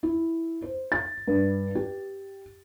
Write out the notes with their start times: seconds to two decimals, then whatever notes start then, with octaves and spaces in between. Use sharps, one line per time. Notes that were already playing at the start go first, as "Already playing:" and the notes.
0.03 E4
0.62 C5
0.92 A6
1.28 G2
1.75 G4